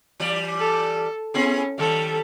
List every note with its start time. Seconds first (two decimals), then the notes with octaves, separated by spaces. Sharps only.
0.20 E3 G3 D5
0.60 A4
1.34 B3 C#4 E4 G#4
1.78 D#3 G3 A4